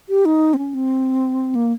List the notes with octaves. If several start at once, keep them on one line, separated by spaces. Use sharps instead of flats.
G4
D#4
C4
C#4
C4
A#3